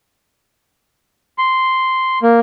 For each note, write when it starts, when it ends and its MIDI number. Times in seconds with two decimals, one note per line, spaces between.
1.38 2.19 84
2.23 2.40 58